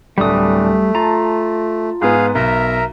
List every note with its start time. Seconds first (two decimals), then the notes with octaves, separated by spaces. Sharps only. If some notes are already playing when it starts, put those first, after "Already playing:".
0.18 D1 G3 A3 D4 D#6
0.95 F4 A5 A#5
2.01 G#2 B3 G#4 F5
2.35 B1 A#4 E5 A#5